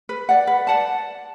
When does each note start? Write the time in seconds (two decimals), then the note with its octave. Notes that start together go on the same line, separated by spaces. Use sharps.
0.09 B4
0.29 D5 F#5
0.47 B4
0.67 D5 F#5 A5